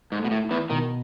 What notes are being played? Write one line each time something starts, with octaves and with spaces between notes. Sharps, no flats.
G#2
A3
B2
A2
E4
E2 E3
B2 D#3